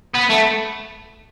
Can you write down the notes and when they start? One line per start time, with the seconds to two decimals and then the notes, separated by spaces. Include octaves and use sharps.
0.15 B3
0.30 A3